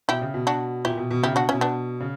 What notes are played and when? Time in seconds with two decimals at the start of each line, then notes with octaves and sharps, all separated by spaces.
0.08 B2 E4 G4
0.21 C#3
0.34 B2
0.47 D4 F#4
0.85 A#2 E4 G4
0.97 B2
1.11 B2
1.23 C#3 E4 G4
1.33 B2 D4 F#4
1.49 B2 C#4 E4
1.61 B3 D4
2.00 C#3